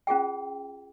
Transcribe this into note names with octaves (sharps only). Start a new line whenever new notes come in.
C#4 F4 G#4 G5